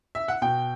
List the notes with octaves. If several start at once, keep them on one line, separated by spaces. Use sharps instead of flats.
E5
F#5
B2 G5